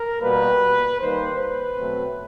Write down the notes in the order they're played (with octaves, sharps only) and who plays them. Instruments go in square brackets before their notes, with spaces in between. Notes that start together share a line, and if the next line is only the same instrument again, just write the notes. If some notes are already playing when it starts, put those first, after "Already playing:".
Already playing: [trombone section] A#4
B2 G3 A#3 B4
D#3 G3 A#3 C5
B4
B2 F#3 A3 C4